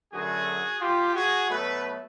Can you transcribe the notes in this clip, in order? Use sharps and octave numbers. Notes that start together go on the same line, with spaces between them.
F#2 D3 F#3 A3 F#4 G#4
F4 G4
F#4 G#4
B2 F#3 A3 A4 B4